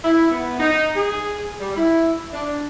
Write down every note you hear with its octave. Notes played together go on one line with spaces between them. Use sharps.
E4
B3
D#4
G#4
G3
E4
D4